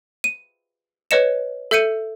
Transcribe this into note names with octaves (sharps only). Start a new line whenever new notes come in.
D#7
B4 C#5 D#5 C#7 E7
A4 E5 G6 C#7 D#7